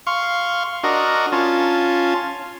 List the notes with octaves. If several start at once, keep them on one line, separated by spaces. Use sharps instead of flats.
F5 C6 C#6
D4 F#4 A#4 D#5
C#4 F4 A5